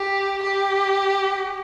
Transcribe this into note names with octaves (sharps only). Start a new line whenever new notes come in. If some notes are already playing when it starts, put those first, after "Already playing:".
Already playing: G4
G4